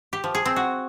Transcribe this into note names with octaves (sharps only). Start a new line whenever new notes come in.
G4
F3
G#4
C4
F#4